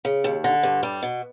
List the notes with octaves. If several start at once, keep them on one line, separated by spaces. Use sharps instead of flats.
C#3
D#2
D3
G2
G3
B2